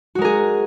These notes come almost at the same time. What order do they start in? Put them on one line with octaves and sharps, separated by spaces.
F#4 G#3 A#4 G#4